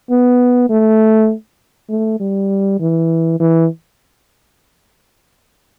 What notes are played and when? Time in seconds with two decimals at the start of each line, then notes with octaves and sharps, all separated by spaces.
0.10 B3
0.70 A3
1.90 A3
2.20 G3
2.80 E3
3.40 E3